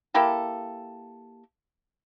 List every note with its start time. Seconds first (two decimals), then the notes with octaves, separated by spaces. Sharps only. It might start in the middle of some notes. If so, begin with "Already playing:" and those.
0.14 A#3 E4 G4 A4